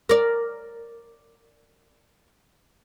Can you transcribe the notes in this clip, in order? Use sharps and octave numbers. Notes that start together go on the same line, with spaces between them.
A#4 D5